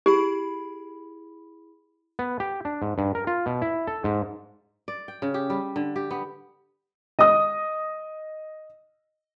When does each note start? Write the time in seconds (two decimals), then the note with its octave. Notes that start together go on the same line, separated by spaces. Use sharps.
0.06 E4 G4 G#4 B5
2.19 B3
2.40 G4
2.65 D4
2.82 G#2
2.98 G2
3.15 A#4
3.27 F4
3.46 B2
3.62 E4
3.87 A4
4.04 G#2
4.88 D5
5.08 G5
5.22 C#3
5.34 G4
5.50 G3
5.76 D3
5.96 G4
6.11 B3
7.19 D#5 D#6